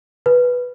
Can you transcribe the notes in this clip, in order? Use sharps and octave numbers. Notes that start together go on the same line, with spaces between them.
B4